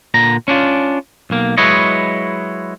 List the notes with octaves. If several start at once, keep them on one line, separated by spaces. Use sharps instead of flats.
A#2 D3 A#5
C#4 D4 F4
B1 A#3
F#3 G#3 E4 B4 C#5 D#5